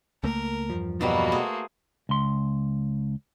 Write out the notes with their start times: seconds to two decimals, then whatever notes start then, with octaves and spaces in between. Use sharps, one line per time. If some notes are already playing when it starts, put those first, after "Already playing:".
0.24 C#2 A3 A#3 A#4
0.70 E2 G2 F3
1.01 B2 F#3 G3 A#3 F#4
1.32 A3 G#4 C5
2.09 C#2 C6